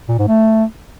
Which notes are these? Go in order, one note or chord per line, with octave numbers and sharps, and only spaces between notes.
A#2
G#2
A3